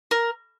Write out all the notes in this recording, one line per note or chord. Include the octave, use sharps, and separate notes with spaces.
A#4